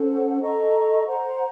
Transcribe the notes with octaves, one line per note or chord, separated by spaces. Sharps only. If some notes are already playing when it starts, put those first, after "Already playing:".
Already playing: C#4 A4 C5 F#5
A4 D#5 A#5 C#6
C5 F#5 A#5